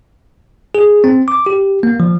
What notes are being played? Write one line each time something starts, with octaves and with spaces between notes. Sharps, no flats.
G#4
C4
D6
G4
A#3
F3